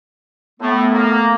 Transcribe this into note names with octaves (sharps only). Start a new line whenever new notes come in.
A2 A3 B3
A#3